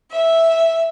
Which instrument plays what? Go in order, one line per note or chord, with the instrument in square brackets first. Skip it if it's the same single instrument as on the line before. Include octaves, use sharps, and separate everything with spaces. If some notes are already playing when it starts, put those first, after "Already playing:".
[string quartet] E5